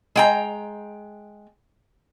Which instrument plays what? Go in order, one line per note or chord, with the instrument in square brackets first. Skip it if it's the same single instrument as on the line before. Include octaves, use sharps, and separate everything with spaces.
[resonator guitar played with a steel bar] G#3 G5 A#5